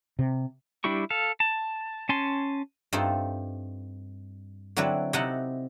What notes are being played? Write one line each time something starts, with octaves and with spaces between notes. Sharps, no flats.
C3
G3 D4 E4 G4 C#6
A4 F5
A5
C#4 G#5 A5 C6
G2 C4 D#4 F4 A4 E5
D3 F#3 C4 E4 B4 D5
C3 D#4 E4 D#5 F#5 A5